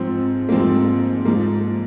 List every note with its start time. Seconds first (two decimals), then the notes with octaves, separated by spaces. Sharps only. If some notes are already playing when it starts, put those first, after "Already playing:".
Already playing: G#2 F3 C4
0.49 A#3
0.52 G#2 F3 C4
1.25 G#2 F3 A#3